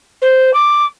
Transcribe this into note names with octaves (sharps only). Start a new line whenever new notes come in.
C5
D6